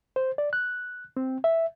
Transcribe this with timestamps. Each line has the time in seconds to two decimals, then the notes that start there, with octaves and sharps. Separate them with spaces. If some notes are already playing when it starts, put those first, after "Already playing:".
0.16 C5
0.38 D5
0.53 F#6
1.17 C4
1.44 E5